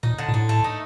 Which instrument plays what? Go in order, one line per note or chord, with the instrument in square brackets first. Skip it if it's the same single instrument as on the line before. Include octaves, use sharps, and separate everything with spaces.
[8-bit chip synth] A#2 [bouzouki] D#4
[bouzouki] D3
[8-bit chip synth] A#2
[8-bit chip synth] A2 [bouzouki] D3
[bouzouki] A3
D#4